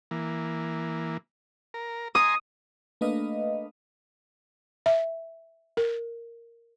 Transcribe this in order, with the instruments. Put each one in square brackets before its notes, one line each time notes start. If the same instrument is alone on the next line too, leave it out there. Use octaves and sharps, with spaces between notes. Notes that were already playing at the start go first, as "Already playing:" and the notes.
[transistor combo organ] E3 A#3
A#4
[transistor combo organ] G#5 A#5 C6 [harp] D#6
[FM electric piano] A3 A#3 D4 B4 D#5 F5
[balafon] E5
A#4